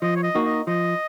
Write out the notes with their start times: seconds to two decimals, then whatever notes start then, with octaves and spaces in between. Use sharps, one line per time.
0.02 F3 D#5
0.16 C#5
0.23 D#5
0.35 A#3 D#4 F#4
0.45 D#5
0.67 F3 D#5